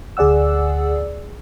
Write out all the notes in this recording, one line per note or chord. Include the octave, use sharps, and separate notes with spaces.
D2 G#4 D5 F#5 E6